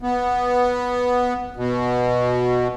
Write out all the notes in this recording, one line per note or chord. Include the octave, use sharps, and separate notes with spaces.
B3
B2